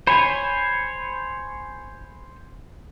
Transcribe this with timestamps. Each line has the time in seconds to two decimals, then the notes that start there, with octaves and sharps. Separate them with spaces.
0.07 C5 C#5 G#5 B5